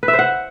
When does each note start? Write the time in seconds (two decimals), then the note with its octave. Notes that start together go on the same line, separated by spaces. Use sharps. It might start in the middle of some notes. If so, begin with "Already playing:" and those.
0.03 B4
0.08 E5
0.13 C5
0.19 F#5